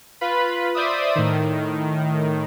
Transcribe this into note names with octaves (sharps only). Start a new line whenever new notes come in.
F4 B4 B5
C5 D5 E5 D#6
A2 D#3